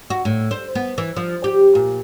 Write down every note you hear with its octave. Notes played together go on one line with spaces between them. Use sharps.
F#4
A2
C5
B3
E3
F3
G4
A#2